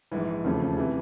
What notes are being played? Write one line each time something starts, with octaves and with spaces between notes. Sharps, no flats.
A#1 G#2 E3
E1 D#2 C#3 F3 A3
C3 E3 G3